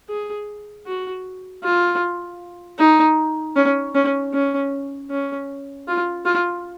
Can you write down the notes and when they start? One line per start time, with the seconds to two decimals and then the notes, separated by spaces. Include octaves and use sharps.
0.09 G#4
0.86 F#4
1.63 F4
2.79 D#4
3.56 C#4
3.95 C#4
4.34 C#4
5.10 C#4
5.88 F4
6.26 F4